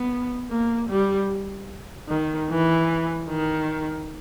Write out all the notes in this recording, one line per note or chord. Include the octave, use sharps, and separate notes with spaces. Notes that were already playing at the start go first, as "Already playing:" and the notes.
Already playing: B3
A#3
G3
D#3
E3
D#3